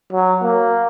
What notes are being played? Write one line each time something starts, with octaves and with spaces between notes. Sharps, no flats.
F#3
A#3